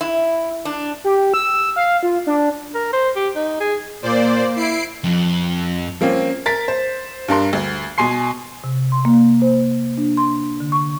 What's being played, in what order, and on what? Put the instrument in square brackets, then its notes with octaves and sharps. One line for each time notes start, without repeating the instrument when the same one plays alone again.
[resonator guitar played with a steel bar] E4
D4
[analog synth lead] G4
E6
F5
F4
D4
[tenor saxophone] A#4
C5
G4
D#4
G#4
[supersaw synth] A#2 C5 D5 [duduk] A#3
[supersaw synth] E4 C7 D7
[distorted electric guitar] F2
[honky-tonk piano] F3 A#3 C4 C#4
A#4 A6 B6
C5
G2 D4 A#4 C6
D2
B2 G#5 C6 C7
[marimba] C3
C6
A#3
C5
D4
C6
D3
C#6